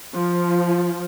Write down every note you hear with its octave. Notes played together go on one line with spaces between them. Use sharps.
F3